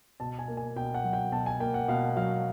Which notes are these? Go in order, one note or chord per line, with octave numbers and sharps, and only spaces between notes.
B2 A5
G#5
A#3
G#5
B2 G5
F#5
F#3
G5
B2 A5
G#5
A#3 G5
F#5
B2 F5
F#3 F5